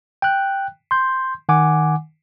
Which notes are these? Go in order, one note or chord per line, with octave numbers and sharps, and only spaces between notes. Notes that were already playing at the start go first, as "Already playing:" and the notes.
G5 F#6
C6 G6
D#3 F#5 G#5 D6